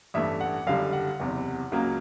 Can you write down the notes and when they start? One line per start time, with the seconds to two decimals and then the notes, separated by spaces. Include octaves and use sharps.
0.14 A1 G2 E3 A3 E5
0.41 F#5
0.67 F#1 F#2 D3 G3 F5
0.93 F#5
1.20 F#1 E2 C3
1.72 C#2 C#3 F#3 A#3